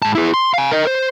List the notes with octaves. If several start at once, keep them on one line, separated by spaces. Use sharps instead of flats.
G#2 A5
E4 G#4
C6
F5 G#5
A#4 D#5
C5